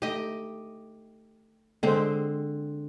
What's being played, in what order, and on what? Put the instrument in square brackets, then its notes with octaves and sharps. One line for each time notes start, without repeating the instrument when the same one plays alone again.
[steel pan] A3 D#4 [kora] G4 D#5
[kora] D3 C4 [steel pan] G#3 C5